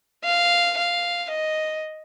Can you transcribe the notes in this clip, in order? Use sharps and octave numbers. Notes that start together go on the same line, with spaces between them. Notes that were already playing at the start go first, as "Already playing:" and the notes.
F5
F5
D#5